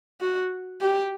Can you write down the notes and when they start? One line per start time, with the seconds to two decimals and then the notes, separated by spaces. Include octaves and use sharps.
0.21 F#4
0.81 G4